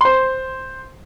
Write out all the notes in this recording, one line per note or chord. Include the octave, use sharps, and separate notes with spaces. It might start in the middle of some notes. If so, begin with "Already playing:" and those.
C5 C6